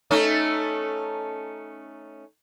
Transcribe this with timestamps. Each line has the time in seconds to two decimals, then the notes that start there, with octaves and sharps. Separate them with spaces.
0.11 A3 C#4 D#4